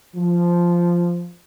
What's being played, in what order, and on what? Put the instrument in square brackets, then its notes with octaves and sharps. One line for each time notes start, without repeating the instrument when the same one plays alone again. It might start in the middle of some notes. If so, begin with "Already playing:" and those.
[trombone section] F3